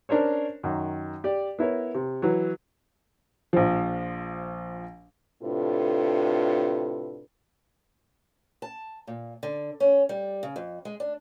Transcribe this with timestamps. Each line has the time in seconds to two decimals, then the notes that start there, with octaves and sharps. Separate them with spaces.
0.09 C#4 D4 A#4 C5 C#5
0.63 F#2 D#3
1.24 G4 D5
1.59 B3 E4 A#4 C#5
1.95 C3
2.22 E3 F#3
3.53 A#1 F3
5.42 A2 C3 D4 F4 A4 B4
8.62 A5
9.07 A#2
9.43 D3
9.80 C#4
10.09 G3
10.43 C#3
10.56 F2
10.85 G#3
11.00 D4